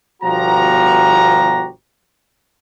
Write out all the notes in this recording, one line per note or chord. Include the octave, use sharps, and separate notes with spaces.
G1 B2 F3 F#4 G4 A#5